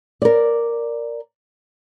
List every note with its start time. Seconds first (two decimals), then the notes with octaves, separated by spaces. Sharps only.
0.22 A#4 D5